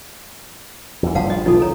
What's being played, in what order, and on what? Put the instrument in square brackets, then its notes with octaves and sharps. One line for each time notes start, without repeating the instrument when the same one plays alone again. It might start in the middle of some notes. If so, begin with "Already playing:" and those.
[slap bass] E2 E3
[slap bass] F#1 G2 F3 [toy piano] F5 F#5 A5
[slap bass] A2 F3 [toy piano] D#5
[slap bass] B1 E3 F3 [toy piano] D#4 F4 A4
[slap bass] C#3 [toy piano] A4 A#5